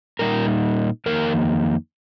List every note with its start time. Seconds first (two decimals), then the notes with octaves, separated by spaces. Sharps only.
0.19 A#2 G3 A#3 D#4 A#4
1.06 F2 D#3 A#3 D#4 A#4